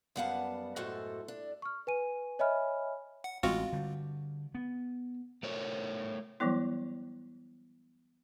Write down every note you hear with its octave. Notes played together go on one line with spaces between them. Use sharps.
F#2 G3 B3 F5 F#5 A5
F#2 A2 G#3 F#4 A4 C5
D4
C#6 F6
B4 G#5 D#7
C#5 D#5 E5 G#5 B5 F6
F#5
A1 G#3 C4 F4 F#4 F5
D3 G3
B3
A3 A#4 C#5
E3 F#3 G3 B3 E4